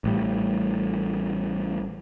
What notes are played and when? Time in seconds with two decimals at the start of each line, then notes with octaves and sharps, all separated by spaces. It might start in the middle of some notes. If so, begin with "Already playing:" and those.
0.04 A1 A2 G3